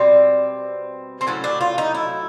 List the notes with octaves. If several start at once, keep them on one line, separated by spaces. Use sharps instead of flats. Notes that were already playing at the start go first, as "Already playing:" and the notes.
Already playing: B2 G3 C4
C4
A2 F#3 A3 C#4
D4
F4
D#4
E4